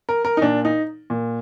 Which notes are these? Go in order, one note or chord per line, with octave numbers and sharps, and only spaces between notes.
A#4
A#4
D#4
A#2 D4
D#4
A#2